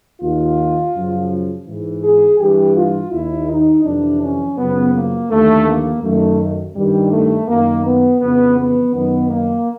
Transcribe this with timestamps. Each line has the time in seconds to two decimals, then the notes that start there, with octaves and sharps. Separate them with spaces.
0.20 D#2 D#3 F4
0.94 F#2 C#3 F3
1.67 G#2 E3
2.03 G#4
2.38 G2 E3 G4
2.75 F4
3.11 D#2 D#3 E4
3.48 D#4
3.84 F2 C3 E3 D4
4.21 C#4
4.57 F#2 C#3 F3 B3
4.93 A#3
5.30 D#2 D3 F3 A3
5.66 A#3
6.02 F#2 D#3 A3
6.74 G2 D#3 G3
7.12 A3
7.48 F#2 D#3 A#3
7.84 B3
8.20 F2 C#3 E3 B3
8.57 B3
8.93 F#2 D#3 B3
9.30 A#3